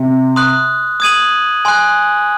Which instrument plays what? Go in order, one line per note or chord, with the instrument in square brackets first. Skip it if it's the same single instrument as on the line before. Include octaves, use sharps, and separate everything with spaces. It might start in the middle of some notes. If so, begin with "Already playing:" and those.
Already playing: [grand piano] C3
[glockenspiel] C6 D#6 F#6
D#6 G#6 D#7 F#7
G#5 C6 F#6